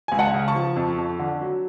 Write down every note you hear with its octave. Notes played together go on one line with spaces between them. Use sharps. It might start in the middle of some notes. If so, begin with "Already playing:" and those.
C#2 G#5
F#5 A5
C#3
A5 C#6
F3
F2
F2
D3
F#3